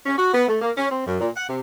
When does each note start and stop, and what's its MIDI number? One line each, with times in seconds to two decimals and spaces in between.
0.06 0.17 61
0.18 0.32 66
0.33 0.45 59
0.48 0.57 57
0.62 0.72 58
0.77 0.91 61
0.91 1.02 60
1.05 1.18 42
1.19 1.29 46
1.36 1.44 78
1.48 1.60 48